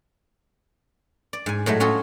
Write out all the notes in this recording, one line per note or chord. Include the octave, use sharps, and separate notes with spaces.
D5
G#2 G#5
A2 F#3 G#3 A3
C#4 F4 F#4 G#4 A4